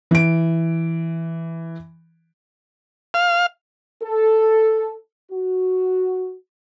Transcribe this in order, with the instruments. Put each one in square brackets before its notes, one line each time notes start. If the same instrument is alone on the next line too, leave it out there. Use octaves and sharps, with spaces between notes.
[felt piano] E3 D7
[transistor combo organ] F5
[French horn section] A4
F#4